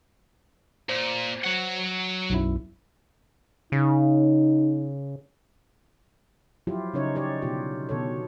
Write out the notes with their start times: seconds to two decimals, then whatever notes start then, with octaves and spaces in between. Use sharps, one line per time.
0.89 A#2 C5
1.44 F#3 F#5
2.30 B1 F#2 E4
3.72 C#3 D#4
6.67 F3 F#3 E4 F4 G4
6.94 C#3 C#4 D#4 C#5
7.15 G4 C#5 D5
7.42 B2 D3 D#4 F4 G4
7.89 B2 D3 D#3 A4 C#5